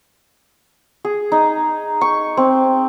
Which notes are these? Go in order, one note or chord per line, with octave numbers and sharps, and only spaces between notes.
G#4
D#4
C#6
C4